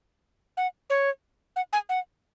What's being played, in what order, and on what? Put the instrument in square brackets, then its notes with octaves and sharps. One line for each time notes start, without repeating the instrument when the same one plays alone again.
[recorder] F#5
C#5
F#5
G#5
F#5